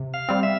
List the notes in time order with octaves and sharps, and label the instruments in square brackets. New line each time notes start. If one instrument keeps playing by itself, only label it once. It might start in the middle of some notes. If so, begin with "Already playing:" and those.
Already playing: [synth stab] C3
[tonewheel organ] F5
[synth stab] G3 C4
[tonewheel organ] E5